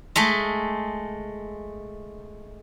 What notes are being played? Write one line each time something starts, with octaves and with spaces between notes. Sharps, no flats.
G#3 A3